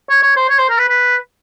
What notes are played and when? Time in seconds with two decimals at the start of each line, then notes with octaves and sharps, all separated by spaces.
0.10 C#5
0.23 C#5
0.36 C5
0.49 C#5
0.59 C5
0.69 A#4
0.79 B4
0.89 B4